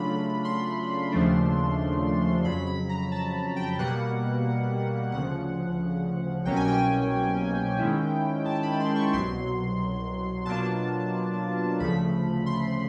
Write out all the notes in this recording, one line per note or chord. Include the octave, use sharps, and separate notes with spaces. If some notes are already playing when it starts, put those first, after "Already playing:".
Already playing: C#3 F#3 A3 D4 F4 B5
C6
D#2 C#3 F3 A3 D4
F2 C#3 F#3 B5
B5
A#5
A5
G5
B2 G3 A#3 F#5
D2 C#3 F3 F#5
C2 B2 F#3 A#3 C#4 G5
G#5
G5
G#2 D#3 G#3 C#4 E4
A5
B5
C6
C#6
C2 B2 F#3 C6
B2 F#3 A#3 D4 F4 A5
D2 C#3 F3 A3 B5
C6